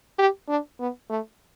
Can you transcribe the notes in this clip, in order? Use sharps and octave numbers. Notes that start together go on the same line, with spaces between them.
G4
D4
B3
A3